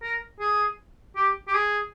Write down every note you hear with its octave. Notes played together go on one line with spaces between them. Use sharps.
A#4
G#4
G4
G4
G#4